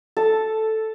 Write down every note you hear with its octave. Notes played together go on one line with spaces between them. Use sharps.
A4